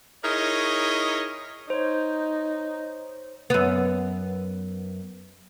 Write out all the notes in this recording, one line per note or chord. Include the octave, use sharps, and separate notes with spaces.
D#4 E4 G#4 A#4 C#5 D#5
D#4 C5 C#5
F#2 B3